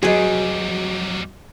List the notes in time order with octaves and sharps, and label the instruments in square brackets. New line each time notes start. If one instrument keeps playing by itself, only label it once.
[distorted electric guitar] F2 G3 [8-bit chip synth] F#3 [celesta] F#4 D#5 [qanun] G#4 B4